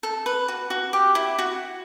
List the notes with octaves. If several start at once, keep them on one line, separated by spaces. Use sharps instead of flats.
A4
B4
F#4
F#4
G4
E4
F#4